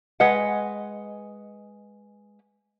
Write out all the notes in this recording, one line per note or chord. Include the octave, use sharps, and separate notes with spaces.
G#3 B4 D#5 F#5